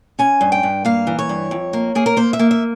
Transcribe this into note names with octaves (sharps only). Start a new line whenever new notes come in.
C#4 G#5
G2
G5
G2
A#3 F5
E3
C#5
G2
F2
A#3
A#3 G#4
A#4
A#3 C5
E5
A#3
E5